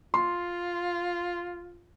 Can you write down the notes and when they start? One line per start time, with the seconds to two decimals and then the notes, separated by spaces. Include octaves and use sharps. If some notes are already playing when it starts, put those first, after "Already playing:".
0.14 F4 C6